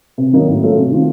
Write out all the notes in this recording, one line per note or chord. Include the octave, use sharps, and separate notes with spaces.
C3
D#3 F#3 A#3 D#4
A2
F#3 A3 C#4 F4
C3
D#3 A3 C4 F4